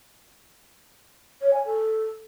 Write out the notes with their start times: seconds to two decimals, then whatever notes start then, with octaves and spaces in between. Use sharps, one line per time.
1.42 C#5
1.53 G#5
1.65 A4